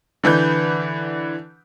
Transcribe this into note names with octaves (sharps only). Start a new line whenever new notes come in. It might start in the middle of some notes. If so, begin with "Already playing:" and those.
D3 E3 B4 G6